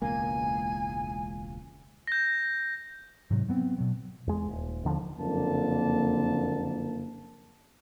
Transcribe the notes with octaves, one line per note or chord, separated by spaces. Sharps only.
E1 C#2 A#3 G#5
G6 A#6
G#2 C3 F#3
F#3 B3 C4
B2 F#3
E2 G#3
D#1
D#2 D3 F3
F#1 F2 D3 A#3 A5